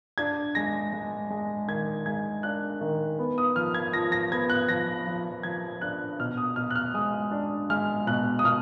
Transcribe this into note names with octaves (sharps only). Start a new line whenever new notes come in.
D4 G#6
G#3 A#6
G#3
G#3
D#3 G#6
G#3 G#6
D4 F#6
D#3
B3
D#6
F3 F6
G#6
F3 A#6
A#6
B3 G#6
F#6
F3 A#6
F3
F3 G#6
D4 F#6
B2 F6
D#6
B2 F6
F#6
F6
G#3 D#6
D4
G#3 F6
B2 F#6
D#6
B2 F6